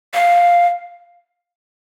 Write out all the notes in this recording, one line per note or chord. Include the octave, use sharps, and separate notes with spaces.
F5